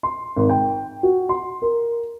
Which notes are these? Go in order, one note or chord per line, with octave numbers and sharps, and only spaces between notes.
C6
G#1
G5
F#4
C6
A#4